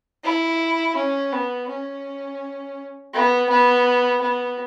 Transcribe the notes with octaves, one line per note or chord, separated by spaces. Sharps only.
E4
C#4
B3
C#4
B3
B3
B3